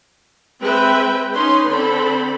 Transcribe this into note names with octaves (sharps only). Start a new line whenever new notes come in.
G#3 C4 B4 E5 G5
C#4 D#4 B4 C6
D3 C4 A4 B5